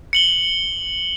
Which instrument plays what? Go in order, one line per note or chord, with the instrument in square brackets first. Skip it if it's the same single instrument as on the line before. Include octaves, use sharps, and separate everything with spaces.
[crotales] C#7 F#7 G7